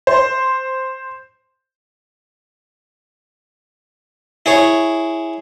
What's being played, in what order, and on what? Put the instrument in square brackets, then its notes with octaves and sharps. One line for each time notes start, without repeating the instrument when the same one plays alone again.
[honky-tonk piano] C5
[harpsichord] E4 G#4 C#5